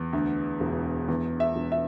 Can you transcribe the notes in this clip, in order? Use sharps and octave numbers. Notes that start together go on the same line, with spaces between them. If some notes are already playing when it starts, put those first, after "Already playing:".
Already playing: E2
D2
E1
E2
E5
E1
E5